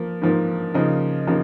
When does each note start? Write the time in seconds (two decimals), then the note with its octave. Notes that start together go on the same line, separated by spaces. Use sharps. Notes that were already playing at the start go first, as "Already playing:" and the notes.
Already playing: F3 A#3
0.22 G#2 F3 A#3
0.74 C#3 F3 A#3 D#4
1.27 C#3 F3 A#3 D#4